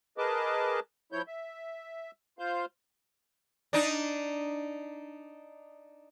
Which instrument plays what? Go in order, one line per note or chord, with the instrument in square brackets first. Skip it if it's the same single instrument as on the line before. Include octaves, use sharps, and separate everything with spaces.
[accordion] G#4 A#4 B4 D#5 A5 D6
F3 E4 C#5 G6
E5
F4 C5 F5 G6
[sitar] D4 D#4